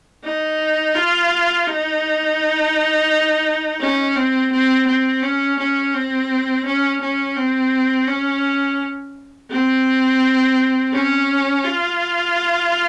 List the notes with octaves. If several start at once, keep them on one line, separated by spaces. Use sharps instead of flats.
D#4
F4
D#4
C#4
C4
C4
C4
C#4
C#4
C4
C#4
C#4
C4
C#4
C4
C#4
F4